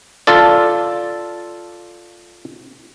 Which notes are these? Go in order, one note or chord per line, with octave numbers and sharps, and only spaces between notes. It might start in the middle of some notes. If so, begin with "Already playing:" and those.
F4 A4 D5